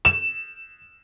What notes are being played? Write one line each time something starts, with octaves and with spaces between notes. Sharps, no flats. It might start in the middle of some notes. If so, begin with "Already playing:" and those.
E7